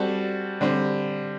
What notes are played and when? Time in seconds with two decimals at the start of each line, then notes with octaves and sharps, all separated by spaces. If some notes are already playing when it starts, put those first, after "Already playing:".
Already playing: G3 C4 F#4 A4
0.61 D3 G3 C4